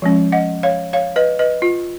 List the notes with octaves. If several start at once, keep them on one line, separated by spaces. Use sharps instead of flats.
F3 G#3 C#4
D#5 F#5
C#5 F5
C#5 F5
B4 D#5
B4 D#5
F4